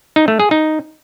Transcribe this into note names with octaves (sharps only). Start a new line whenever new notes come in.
D#4
A3
G#4
D#4